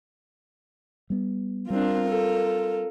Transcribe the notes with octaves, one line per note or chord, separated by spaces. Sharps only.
G3 B3
G3 C4 D4 F4 A#4
A4